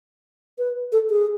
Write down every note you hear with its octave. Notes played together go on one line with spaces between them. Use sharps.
B4
A4
G#4